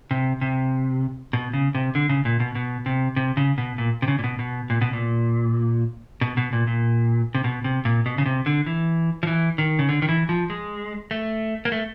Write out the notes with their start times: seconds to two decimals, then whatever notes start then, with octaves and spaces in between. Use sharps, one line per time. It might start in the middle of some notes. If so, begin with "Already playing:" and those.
0.11 C3
0.41 C3
1.33 B2
1.53 C#3
1.75 C3
1.95 D3
2.09 C#3
2.25 A#2
2.40 B2
2.55 B2
2.86 C3
3.16 C3
3.37 C#3
3.58 B2
3.78 A#2
4.02 C3
4.08 C#3
4.19 A#2
4.24 B2
4.39 B2
4.70 A#2
4.81 B2
4.93 A#2
6.21 B2
6.37 B2
6.53 A#2
6.67 A#2
7.35 C3
7.44 B2
7.64 C3
7.85 A#2
8.06 B2
8.18 C#3
8.26 C3
8.46 D3
8.66 E3
9.23 F3
9.27 E3
9.58 D#3
9.79 C#3
9.89 D3
10.02 D#3
10.09 E3
10.29 F3
10.50 G#3
11.11 A3
11.65 A#3
11.72 A3